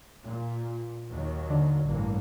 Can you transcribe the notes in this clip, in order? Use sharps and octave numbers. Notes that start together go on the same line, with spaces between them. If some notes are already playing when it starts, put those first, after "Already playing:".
A#2
D#2 D#3 F#3
D3
A1 G2 A#3